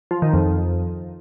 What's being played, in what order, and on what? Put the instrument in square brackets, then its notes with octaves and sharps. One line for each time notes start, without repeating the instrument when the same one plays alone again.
[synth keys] F3
D#3
F2